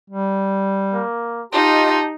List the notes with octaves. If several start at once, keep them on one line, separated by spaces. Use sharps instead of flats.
G3
A#3
D#4 F4 G4 D#5 A5 C6